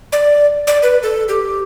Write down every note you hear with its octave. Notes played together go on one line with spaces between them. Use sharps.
D5
D5
B4
A4
G4